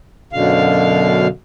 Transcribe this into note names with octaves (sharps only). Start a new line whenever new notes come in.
F#2 B2 D3 F5